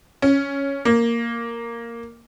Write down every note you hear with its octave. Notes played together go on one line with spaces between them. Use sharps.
C#4
A#3